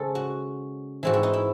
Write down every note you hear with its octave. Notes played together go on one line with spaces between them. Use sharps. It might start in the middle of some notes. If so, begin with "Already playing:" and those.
Already playing: C#3 G#3 C#4 A4 C5
F#4
G#2 E3 C4 F#4
E4
D#4
E4